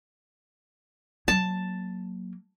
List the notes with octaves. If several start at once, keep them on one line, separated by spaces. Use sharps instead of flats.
F#3 A#3 A5